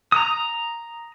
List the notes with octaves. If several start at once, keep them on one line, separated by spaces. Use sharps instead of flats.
A#5 D#6